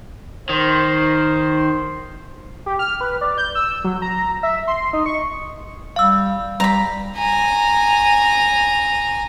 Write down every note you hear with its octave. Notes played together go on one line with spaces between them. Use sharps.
D#3 C5
G4
F6
B4
D5
G6
E6
F#3
A#5
E5
C6
D#4
C#6
G3 F5 E6
G3 A#5 B5
G#5 A#5